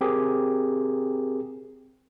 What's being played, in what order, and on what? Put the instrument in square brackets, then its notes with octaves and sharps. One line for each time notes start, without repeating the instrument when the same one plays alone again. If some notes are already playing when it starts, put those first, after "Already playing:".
[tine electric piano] C4 G4 G#4 A#4